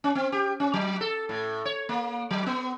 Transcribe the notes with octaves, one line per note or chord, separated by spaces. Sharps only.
C#4
C4
G4
C#4
F#3
A4
A2
C#5
A#3
F#3
B3